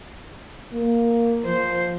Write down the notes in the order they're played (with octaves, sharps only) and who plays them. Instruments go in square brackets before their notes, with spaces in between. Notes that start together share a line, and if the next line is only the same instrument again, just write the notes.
[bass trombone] A#3
[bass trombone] F3 [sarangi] C5